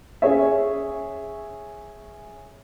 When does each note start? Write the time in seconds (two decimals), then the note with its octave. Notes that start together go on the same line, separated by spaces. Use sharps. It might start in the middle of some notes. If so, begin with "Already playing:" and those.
0.22 C#4 G#4 C#5 E5